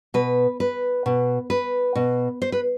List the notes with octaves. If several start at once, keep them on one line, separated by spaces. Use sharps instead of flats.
B2 B4
B4
B2
B4
B2
C5
B4